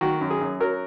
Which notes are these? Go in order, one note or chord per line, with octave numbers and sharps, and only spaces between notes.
D#3 F#4
F#2
G#4
F#2
F#3 A#4